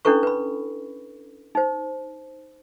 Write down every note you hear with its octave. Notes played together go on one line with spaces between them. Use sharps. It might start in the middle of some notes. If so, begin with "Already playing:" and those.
C#4 D4 E4 A4 B4 C#6
B4 B5
D#4 C5